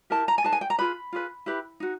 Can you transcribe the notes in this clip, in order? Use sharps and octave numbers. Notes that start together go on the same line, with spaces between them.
E4 G4 A#4 A5
A#5
G#5
D#4 G#4 B4 A5
G#5
G5
A#5
F4 G#4 B4 B5
F4 G#4 B4
E4 G4 B4
D#4 F#4